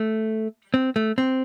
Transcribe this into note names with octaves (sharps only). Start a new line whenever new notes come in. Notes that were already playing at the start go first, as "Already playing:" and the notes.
Already playing: A3
C4
A3
C4